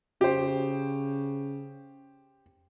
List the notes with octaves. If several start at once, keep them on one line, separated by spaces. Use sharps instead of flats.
C#3 G4 C5